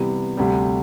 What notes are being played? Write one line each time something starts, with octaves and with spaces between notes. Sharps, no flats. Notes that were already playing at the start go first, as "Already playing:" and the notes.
Already playing: C3 E3 G3 B3
D2 C3 G3